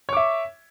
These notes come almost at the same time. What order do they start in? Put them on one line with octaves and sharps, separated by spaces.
C#5 D6 E5